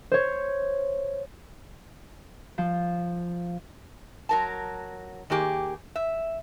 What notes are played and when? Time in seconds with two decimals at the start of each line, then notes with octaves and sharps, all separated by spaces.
0.12 C5 C#5
2.58 F3
4.29 F#3 A#4 A5
5.30 D#3 A#3 G4 G#4
5.96 E5